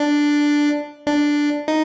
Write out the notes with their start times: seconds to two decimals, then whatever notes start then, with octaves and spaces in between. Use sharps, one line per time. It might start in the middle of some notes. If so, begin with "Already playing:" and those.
Already playing: D4
1.07 D4
1.68 D#4